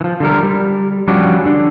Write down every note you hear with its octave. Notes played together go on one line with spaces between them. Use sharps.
E3 F3
D3 G3 A#4
G3
F3 G3 C#4 D4 F#4 D5
D3 D4